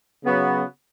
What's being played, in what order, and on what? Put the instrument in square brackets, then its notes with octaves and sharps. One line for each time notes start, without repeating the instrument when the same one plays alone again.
[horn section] C#3 F#3 B3 F#4